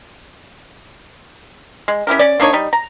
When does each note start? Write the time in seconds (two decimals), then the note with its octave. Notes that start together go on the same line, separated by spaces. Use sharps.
1.88 G#3
2.07 C#4 E4 G4 A#4
2.19 C#4 D5
2.40 A#3 D4 D#4 C#5
2.53 G3 D#4
2.73 A#5